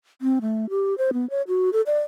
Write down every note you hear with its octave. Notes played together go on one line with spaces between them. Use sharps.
C4
A3
G4
C5
B3
C#5
F#4
A4
D5